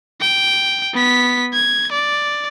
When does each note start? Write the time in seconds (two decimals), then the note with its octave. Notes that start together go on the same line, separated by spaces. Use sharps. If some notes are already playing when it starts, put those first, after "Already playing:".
0.21 G5
0.94 B3 B6
1.53 G#6
1.92 D5